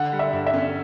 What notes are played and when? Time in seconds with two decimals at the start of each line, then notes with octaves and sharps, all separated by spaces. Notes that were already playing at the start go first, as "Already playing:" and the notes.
Already playing: D3 F#5
0.12 G3
0.19 E5
0.33 G2
0.46 E5
0.53 C#4